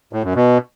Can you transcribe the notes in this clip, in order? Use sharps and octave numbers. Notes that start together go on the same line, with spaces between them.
A2
F#2
B2